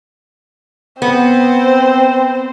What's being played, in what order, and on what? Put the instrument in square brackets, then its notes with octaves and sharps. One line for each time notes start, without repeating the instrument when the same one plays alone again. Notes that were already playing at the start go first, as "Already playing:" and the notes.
[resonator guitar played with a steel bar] B3 [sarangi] C4 [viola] C5